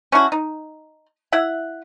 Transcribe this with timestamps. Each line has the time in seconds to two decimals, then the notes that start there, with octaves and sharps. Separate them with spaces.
0.12 C#4 D4 E4 F#4
0.32 D#4
1.32 E4 E5 F#5